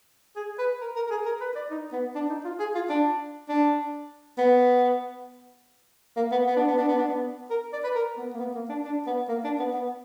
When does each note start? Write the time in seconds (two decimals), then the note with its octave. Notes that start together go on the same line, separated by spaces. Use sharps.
0.36 G#4
0.58 B4
0.81 A#4
0.96 A#4
1.06 A#4
1.11 G#4
1.25 A#4
1.41 B4
1.56 D5
1.70 D#4
1.92 B3
2.15 D4
2.29 D#4
2.45 F4
2.59 G#4
2.75 F4
2.89 D4
3.49 D4
4.38 B3
6.17 A#3
6.31 B3
6.47 B3
6.56 D4
6.67 B3
6.77 D4
6.88 B3
6.98 D4
7.08 B3
7.50 A#4
7.73 D5
7.84 B4
7.95 A#4
8.18 B3
8.34 A#3
8.39 B3
8.55 A#3
8.69 D4
8.85 D4
9.07 B3
9.29 A#3
9.44 D4
9.59 B3
9.73 B3